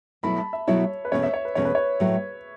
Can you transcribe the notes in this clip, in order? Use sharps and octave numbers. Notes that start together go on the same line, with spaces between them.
B2 F#3 A3 E4 B5
A5
E5
B2 F#3 A3 E4 C#5
B4
E2 B2 A3 C#4 C#5
E5
C#5
B4
E2 B2 A3 C#4 C#5
B4
C#5
A2 F#3 A3